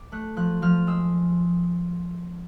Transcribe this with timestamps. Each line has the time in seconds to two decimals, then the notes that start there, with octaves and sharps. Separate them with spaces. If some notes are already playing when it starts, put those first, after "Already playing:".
Already playing: D6
0.12 A3 F#6
0.37 F3 F#6
0.62 F3 F6
0.87 G#3 E6